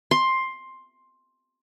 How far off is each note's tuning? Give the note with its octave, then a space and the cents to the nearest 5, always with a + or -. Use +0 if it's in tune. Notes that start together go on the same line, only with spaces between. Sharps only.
C6 +10